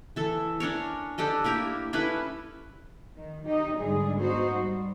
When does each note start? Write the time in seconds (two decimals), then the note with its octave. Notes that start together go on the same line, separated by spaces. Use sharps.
0.16 E3 A4
0.60 C#4 D4 A#4 C#5
1.18 D4 G4 A4 D#5
1.44 A#3 E4 G4 A#4
1.93 C#4 E4 A4 B4
3.16 D#3
3.45 D#4 G4 D#5
3.77 G#2 D3 G3 G#3 G#4
4.18 B3 D#4 F#4 C5
4.54 G3